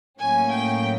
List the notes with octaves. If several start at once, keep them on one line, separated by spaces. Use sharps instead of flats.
A2 F#3 A#3 C#4 G#5
G5